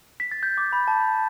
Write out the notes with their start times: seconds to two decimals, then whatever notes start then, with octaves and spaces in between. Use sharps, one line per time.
0.20 B6
0.31 A6
0.43 G6
0.58 D6
0.73 B5
0.88 A5